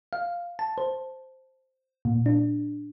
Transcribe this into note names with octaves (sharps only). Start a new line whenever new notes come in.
F5
A5
C5
A#2
D4